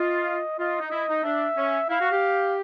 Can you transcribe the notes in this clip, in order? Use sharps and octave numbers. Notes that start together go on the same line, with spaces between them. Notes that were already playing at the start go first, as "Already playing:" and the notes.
Already playing: F4 D#5
F4 D#5
D#4
E4
D#4
D4 E5
C#4
E4 F5
F#4
G4